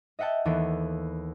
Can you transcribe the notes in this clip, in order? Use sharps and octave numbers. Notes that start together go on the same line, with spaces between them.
D#5 E5 F#5 G5 A5
D#2 E3 B3 A4 D7